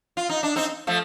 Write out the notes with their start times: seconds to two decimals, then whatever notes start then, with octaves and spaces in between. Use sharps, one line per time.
0.17 F4
0.29 D#4
0.43 D4
0.56 C4 D#4
0.87 F3 A3